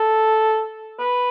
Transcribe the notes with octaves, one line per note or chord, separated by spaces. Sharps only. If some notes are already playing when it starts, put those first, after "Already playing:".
Already playing: A4
B4